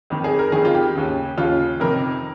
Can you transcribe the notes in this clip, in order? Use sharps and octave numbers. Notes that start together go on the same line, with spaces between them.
F2 D#3
G#4
A#4
F2 D#3 G#4
F4
G4
D#2 C#3
D#2 C#3 F4
F2 C3 D#3 A#4